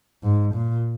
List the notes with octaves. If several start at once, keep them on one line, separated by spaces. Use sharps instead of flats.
G#2
A#2